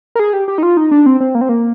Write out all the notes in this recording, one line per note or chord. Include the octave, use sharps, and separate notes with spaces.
A#4
G#4
G4
G4
D#4
F4
D#4
D4
C4
C4
A#3
C4
A#3